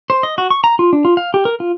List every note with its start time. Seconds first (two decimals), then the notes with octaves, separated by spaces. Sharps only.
0.10 C5
0.23 D#5
0.38 F#4
0.50 C#6
0.64 A#5
0.79 F4
0.93 D4
1.05 F4
1.17 F5
1.34 G4
1.45 A#4
1.60 F4